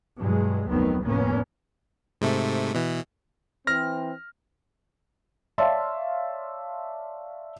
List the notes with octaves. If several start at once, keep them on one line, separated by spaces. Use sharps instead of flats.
G2 B2 E3 F#3 G#3
F1 D2 D#3 F#3 B3 C4
F1 A2 A#3 B3 C#4
G#2 C3 A3
B2 E3
E3 C4 F6 A#6
C#5 D5 E5 F5 A5 C6